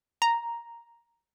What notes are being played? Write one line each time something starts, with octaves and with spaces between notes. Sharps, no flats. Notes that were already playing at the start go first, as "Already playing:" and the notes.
A#5